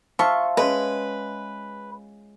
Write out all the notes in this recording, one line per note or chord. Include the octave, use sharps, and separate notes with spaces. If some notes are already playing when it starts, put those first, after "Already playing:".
F4 C5 E5 A5 C#6
G#3 C#4 B4